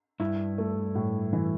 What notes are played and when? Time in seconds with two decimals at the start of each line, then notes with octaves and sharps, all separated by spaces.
0.20 G2 E4
0.58 A3
0.95 A2
1.33 E3